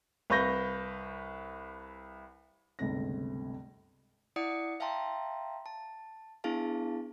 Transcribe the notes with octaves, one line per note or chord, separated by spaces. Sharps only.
C2 B4 F5 C#6 G6 A#6
G1 C#2 C3 A3 C4 A#6
E4 D5 F#5 D#6 C#7
E5 F5 G5 A5 A#5 C6
A5
B3 D4 E4 G#4 F5 A5